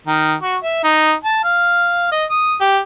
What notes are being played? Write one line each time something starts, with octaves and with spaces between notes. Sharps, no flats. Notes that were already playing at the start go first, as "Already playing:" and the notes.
D#3
F#4
E5
D#4
A5
F5
D#5
D#6
G4